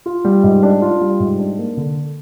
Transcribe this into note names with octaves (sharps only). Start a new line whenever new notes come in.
F4
G3
G#2
D4
F4
G3
G#2
D4
A#3
D3